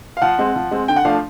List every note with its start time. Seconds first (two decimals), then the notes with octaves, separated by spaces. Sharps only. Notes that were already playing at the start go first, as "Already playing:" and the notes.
0.17 F5
0.22 F3 F#5
0.38 G#3 C4
0.56 F3
0.71 G#3 C4
0.88 D3 G5
0.96 F#5
1.05 F3 A3 D4 F5